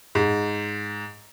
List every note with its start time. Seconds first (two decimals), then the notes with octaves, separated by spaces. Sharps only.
0.15 G#2